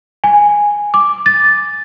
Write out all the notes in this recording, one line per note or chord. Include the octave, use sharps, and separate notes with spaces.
G#5
D6
A6